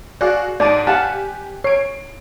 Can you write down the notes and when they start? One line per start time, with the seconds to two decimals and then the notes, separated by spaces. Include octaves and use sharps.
0.21 F#4 G#4 D5 F5
0.60 G#2 D5 A5 D#7
0.87 G4 F5 F#5 G#5 A5 F#6
1.64 C#5 C7 D7